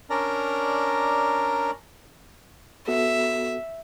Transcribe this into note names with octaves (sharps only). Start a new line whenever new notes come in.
C#4 D4 A#4 D5 A#5
B3 F#4 A4 E5